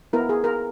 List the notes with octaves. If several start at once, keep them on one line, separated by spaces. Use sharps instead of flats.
B3 E4 A#4
G#4
A#4